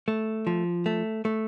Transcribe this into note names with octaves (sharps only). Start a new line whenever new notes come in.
A3
F3
A3
A3